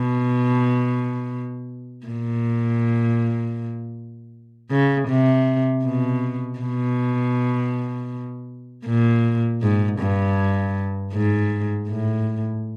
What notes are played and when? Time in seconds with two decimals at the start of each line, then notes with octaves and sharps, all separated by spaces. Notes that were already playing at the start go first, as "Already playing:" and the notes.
Already playing: B2
2.07 A#2
4.71 C#3
5.08 C3
5.84 B2
6.59 B2
8.86 A#2
9.62 G#2
10.00 G2
11.13 G#2
11.88 A2